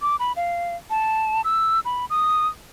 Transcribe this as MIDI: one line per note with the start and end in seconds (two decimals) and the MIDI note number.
0.02 0.16 86
0.19 0.32 83
0.36 0.75 77
0.90 1.41 81
1.44 1.80 88
1.85 2.05 83
2.10 2.47 87